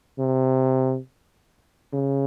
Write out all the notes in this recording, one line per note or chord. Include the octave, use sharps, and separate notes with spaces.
C3
C#3